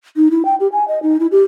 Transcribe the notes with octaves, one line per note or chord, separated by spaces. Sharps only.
D#4
E4
G5
G4
G#5
D#5
D#4
E4
G4